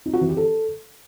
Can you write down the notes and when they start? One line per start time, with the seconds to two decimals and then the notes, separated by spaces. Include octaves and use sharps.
0.06 D#4
0.13 F#4
0.21 E3
0.29 G4
0.37 A4